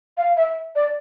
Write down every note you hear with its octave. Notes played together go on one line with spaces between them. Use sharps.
F5
E5
D5